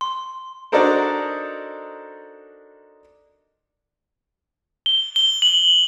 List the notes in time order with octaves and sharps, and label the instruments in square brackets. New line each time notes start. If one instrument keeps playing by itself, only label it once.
[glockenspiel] C6
[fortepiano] D4 D#4 F#4 A4 A#4 C5
[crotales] G7
G7
F#7